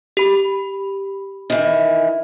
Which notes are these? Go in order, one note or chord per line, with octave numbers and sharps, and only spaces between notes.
G4 B5
D#3 E3